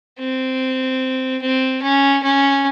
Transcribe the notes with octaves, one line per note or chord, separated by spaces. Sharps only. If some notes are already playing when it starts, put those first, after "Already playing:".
C4
C4
C#4
C#4